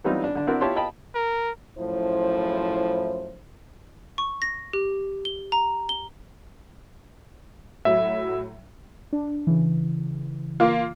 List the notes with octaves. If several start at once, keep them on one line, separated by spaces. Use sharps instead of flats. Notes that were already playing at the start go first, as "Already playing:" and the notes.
E3 F#3 G3 C4 D#4 F4
D4
D3 D4
C4 D4 E4 F#4 A#4 D5
E4 F4 G4 C#5 A5 C6
D#5 F5 G5 A5 B5
A#4
F#2 A2 F3 E4 C5
C#6
A#6
G4
G7
A#5
G7
A2 F#3 E5
D4
C#3 E3
A#3 F4